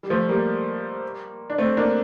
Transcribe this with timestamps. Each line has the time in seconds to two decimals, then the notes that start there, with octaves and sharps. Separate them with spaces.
0.03 G3
0.10 F3 A3
0.29 G3 A#3
1.50 D4
1.58 A3 C4
1.77 A#3 D4